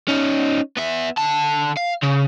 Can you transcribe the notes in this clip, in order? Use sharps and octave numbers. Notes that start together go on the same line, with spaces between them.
C#4 D#4
B3 E5
D3 A5
F5
C#3